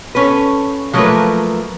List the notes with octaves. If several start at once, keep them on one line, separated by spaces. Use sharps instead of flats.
C#4 A4 B4
F3 F#3 A3 A#3 A#4 B4